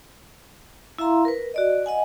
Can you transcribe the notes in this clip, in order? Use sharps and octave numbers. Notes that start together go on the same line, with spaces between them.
E4 E5 F5 A#5 C6
A#4 B4
F#4 D5 D#5
D#5 F#5 G#5